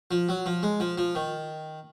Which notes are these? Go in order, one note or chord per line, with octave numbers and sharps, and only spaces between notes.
F3
F#3
F3
G#3
F3
F3
D#3